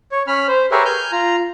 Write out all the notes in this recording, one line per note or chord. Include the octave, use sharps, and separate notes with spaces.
C#5
C#4 B5 F6
C5
G4 G#4 A#4 B4 C#5 E5
G#5 F6 G6
F4 A#5